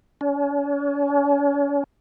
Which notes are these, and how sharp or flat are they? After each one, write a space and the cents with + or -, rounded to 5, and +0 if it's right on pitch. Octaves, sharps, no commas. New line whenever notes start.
C#4 +40